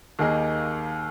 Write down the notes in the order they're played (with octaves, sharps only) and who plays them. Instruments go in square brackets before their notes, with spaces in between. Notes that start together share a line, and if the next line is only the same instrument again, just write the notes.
[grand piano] D#2 D#3 A#3 G#4 D#5